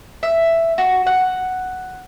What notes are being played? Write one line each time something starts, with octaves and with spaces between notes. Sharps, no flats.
E5
F#4
F#5